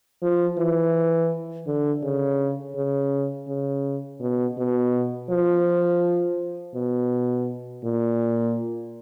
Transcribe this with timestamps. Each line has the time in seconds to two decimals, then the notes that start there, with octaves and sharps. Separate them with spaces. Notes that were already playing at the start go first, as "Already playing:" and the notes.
0.22 F3
0.58 E3
1.66 D3
2.03 C#3
2.76 C#3
3.48 C#3
4.21 B2
4.58 B2
5.30 F3
6.75 B2
7.84 A#2